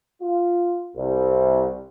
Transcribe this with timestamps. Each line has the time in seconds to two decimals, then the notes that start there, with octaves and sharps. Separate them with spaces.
0.22 F4
0.96 C2